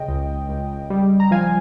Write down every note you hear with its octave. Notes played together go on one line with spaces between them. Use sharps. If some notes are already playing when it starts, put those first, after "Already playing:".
Already playing: C#3 D#5 G5
C#2
C#2
G3
A#5
F3 F5 G#5